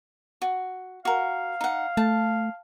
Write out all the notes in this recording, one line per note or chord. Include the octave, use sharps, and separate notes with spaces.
F#4
F#4 A#4 F5
D#4 F#5
A3 A5